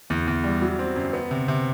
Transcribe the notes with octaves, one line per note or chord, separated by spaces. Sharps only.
E2
E2
G3
F#3
C4
F#2
B3
C3
C3